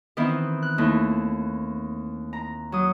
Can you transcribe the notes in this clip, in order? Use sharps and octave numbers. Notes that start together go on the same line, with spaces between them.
D#3 E3 B3 C4 E4
F#6
D#2 A3 D#4 E4
A#5
F#3 D#6